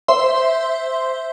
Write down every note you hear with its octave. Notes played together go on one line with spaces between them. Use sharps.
C5 E5 C6